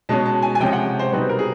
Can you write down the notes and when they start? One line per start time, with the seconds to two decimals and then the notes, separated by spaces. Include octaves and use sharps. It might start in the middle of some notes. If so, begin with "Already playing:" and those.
0.09 B2 G#3 C#4 A5
0.26 A5
0.42 G#5
0.55 G#5
0.60 C3 F3 G#3 C#4 G5
0.73 F#5
0.99 C5
1.12 B2 G3 C4 D#4 B4
1.29 A#4
1.39 G#4